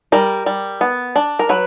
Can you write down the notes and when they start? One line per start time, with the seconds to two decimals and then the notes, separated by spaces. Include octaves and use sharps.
0.12 G3 A#4
0.46 G3
0.81 B3
1.16 D4
1.39 A#4
1.49 F#3 B4